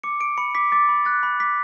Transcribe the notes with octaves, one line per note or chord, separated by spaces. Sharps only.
D6 C#7
D6 D7
B5 C#7
D6 B6
D6 A6
B5
F#6 A6
B5
D6 B6